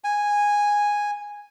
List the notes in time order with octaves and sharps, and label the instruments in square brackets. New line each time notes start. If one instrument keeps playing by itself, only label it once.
[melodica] G#5